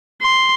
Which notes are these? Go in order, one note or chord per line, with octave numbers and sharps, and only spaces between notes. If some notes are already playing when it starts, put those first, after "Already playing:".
C6